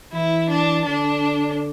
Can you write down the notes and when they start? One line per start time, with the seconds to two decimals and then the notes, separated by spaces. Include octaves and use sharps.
0.13 E3 E4
0.50 D4
0.86 D3 D4